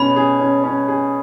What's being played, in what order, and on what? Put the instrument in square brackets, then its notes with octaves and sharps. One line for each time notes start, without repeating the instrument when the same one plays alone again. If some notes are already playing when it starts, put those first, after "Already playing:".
Already playing: [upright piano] B2 C#4 G#4 [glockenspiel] B5
[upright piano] G#4
C#4
C#4
G#4